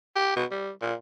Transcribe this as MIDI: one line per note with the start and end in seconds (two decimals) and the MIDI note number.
0.16 0.32 67
0.36 0.45 47
0.51 0.70 55
0.82 0.94 46